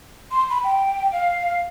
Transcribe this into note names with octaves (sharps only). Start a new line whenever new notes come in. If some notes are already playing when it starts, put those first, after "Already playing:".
C6
B5
G5
F5